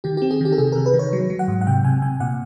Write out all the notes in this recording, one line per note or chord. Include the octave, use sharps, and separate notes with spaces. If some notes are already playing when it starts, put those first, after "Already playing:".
D#3 G4
C4 G4
G#4
D#3 G4
A4
C3 G#4
C3 A#4
B4
D#3
C#5
F#3
F#3
F#5
G#2
F#5
C3 G5
C3 G#5
C3 G#5
A#2 F#5